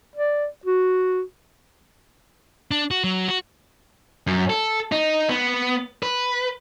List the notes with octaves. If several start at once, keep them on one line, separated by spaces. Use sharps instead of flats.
D5
F#4
D4
F#4
F#3
F#4
F#2
A4
D#4
B3
B4